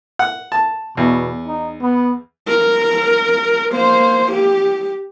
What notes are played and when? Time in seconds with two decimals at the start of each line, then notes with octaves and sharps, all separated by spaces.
0.19 F#5
0.52 A5
0.97 E2 B2
1.47 D#4
1.81 B3
2.48 A#4
3.72 A#3 C5
4.32 G4